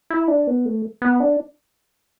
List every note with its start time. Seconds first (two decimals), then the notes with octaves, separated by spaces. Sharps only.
0.10 E4
0.28 D4
0.47 B3
0.66 A3
1.02 B3
1.20 D4